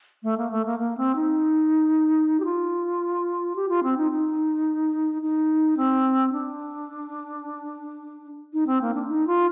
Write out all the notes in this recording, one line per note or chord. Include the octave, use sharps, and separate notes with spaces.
A3
A#3
A3
A#3
A#3
C4
D#4
G4
F4
G4
F4
C4
D#4
D#4
D#4
C4
D4
D#4
C4
A#3
D4
D#4
F4